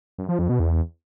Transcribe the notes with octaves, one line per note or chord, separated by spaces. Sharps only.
F#2
F3
F2
B2
E2